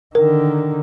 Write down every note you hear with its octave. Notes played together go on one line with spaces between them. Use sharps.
D3 D#3 A#4